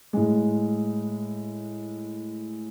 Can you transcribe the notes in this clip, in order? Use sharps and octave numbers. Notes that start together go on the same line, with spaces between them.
A2 G#3